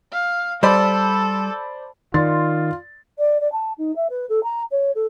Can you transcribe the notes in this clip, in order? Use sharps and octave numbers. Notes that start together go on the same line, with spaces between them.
F5
G3 A4 C5 D5 B5
D#3 F4 D5 C6 A6
D5
D5
A5
D#4
E5
B4
A4
A#5
C#5
A4